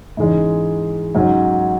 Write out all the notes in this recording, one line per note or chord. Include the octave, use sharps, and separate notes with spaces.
G#2 E3 G#3 C#4
G#2 F#3 C#4